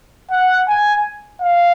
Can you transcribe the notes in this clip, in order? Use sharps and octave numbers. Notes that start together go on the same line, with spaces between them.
F#5
G#5
F5